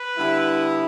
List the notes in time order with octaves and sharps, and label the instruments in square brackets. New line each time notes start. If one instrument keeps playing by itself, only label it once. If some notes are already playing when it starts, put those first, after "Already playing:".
Already playing: [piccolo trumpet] B4
[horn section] D3 G3 B3 E4